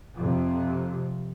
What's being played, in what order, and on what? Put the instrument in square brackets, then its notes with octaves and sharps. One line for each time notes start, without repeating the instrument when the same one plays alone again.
[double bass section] F2 C3